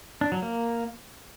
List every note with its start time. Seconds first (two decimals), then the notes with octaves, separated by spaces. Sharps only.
0.21 D4
0.32 F#3
0.42 A#3